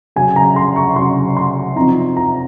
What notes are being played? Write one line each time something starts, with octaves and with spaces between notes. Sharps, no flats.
C#3 F#3 C#4 G#5
A#5
C6
C#6
C#3 F#3 C#4 C6
C6
C3 F3 C4 D#4 A#5
A#5